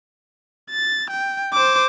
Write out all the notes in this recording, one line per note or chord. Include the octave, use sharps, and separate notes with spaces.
A6
G5
C5 D6